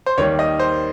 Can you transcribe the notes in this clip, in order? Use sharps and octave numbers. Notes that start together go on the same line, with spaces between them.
C5
D#2 D#3 G3 C#5
D#5
C5